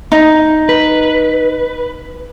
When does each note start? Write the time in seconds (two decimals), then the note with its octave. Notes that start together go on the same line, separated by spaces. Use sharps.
0.12 D#4
0.69 B4